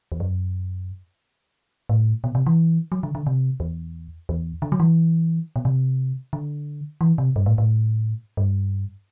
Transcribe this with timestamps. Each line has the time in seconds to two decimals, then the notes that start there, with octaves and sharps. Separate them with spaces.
0.12 E2
0.20 F#2
1.89 A2
2.24 B2
2.35 C3
2.46 E3
2.92 F#3
3.03 D3
3.15 D3
3.27 C3
3.60 E2
4.29 E2
4.62 D3
4.72 F#3
4.80 E3
5.56 B2
5.65 C3
6.33 D3
7.01 E3
7.18 C3
7.36 G2
7.46 A2
7.58 A2
8.37 G2